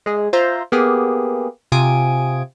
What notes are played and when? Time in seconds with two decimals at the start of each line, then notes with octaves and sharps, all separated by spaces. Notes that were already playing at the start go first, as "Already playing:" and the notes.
0.06 G#3 G#4
0.33 F4 C5 E5 A#5 C6
0.72 A#3 B3 G4 G#4
1.72 C3 F4 G#5 D#6 G#6 D7